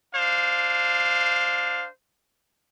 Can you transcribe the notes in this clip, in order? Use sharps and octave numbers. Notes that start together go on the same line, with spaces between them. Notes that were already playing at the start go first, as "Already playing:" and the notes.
D4 C5 F5